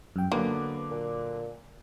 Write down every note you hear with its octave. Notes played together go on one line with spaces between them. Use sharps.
F#2 G5
D3 F#3 A#3 B3 D6
A#2